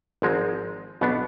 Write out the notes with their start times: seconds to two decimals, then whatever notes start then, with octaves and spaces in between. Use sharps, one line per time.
0.22 G#1 G#2 F3 G#3 C4
1.01 B1 B2 B3 D4